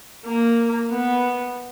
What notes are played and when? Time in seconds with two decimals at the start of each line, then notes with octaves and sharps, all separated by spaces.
0.25 A#3
0.91 B3